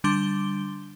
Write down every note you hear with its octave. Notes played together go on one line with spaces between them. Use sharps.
D3 G3 D4 C6 D6 G7